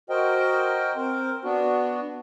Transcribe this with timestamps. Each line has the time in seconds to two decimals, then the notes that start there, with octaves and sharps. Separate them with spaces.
0.10 F#4 A#4 C5 D#5 G5
0.96 C4 A#4 C5
1.44 B3 D4 F#4